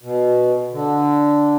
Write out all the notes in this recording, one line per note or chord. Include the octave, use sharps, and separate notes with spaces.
B2
D3